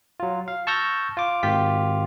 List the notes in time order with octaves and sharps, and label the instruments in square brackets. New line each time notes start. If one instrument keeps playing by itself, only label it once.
[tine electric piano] F#3 F4
F5
A5 C#6 E6 F6 G6 A#6
F4 D6
G#1 F4 G4 B6